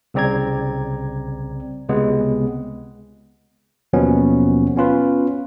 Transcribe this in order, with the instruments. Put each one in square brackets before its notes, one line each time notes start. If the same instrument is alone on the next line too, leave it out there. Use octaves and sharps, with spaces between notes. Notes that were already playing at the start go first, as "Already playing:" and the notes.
[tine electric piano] C2 C#3 C4 D5 A#5 G#6
C#2 C3 G#3 B3
D#2 B2 F3 F#3 B3 C#4
B3 C#4 F4 B4